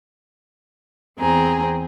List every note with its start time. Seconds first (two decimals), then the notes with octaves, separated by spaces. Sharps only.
1.18 E2 C4 G#4 A#5